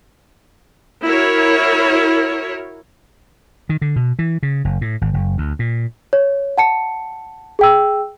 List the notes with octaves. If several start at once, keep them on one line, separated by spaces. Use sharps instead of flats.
E4 F#4 A#4 C#5
D#3
D3
B2
E3
C#3
F#1
A2
G#1
F#1
D2
A#2
C#5
F#5 A5 C#7
G#4 G5 E6